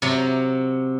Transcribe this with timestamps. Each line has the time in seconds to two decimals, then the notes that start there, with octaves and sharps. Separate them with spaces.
0.02 C3 F#3 A#5